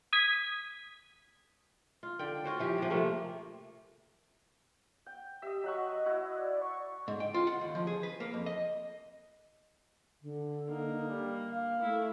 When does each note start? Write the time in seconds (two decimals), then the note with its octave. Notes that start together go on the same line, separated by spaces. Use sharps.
0.13 D#6 G#6 B6
2.03 F4
2.19 D3 D5 G5
2.44 F4 F#4 C5 C#5
2.59 E3 F3 G4
2.78 C3 F3
2.90 C3 F3 A3 A#3
5.06 G5
5.42 G4 D#5 E5
5.64 F#3 D#5 F#5 C#6
6.06 E4 F#4
6.37 D5
6.62 C#6
7.08 G#2
7.20 G5
7.34 F4
7.47 F#5
7.61 D#2
7.75 F3
7.87 G#4
8.03 B4
8.20 A#3
8.34 F2
8.46 D#5
10.22 D3
10.69 A#3 D#4
11.08 G3
11.52 F5
11.82 A3 E4